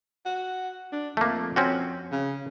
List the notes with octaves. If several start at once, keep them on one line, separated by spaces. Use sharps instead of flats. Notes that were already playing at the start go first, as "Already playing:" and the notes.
F#4
D4
F2 A3 A#3
C4 C#4 F#4
C#3